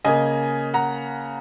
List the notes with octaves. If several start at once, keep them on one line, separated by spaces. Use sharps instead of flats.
C#3 A#3 D#5 G#5
F#5 A#5